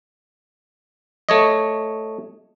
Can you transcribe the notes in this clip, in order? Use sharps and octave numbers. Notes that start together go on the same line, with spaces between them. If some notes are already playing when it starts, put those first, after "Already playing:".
A3 C#5 D#5